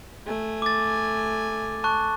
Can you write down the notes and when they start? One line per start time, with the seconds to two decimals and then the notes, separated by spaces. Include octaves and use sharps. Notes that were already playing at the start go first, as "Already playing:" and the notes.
0.26 A3 G#5
0.62 D6 A6
1.84 A5 C#6 F#6